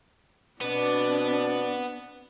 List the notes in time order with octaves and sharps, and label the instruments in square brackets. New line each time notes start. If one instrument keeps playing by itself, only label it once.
[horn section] B2 D5 [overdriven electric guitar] B3 [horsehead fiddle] C4 D4